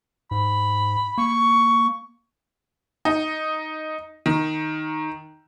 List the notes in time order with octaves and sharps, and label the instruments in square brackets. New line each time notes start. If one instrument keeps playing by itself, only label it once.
[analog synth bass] G#2 [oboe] B5
[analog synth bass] A#3 [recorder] C#6
[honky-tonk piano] D#4
D#3